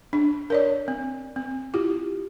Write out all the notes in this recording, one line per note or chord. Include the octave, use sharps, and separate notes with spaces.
D4
A#4 C#5 D5
C4
C4
E4 F4 G4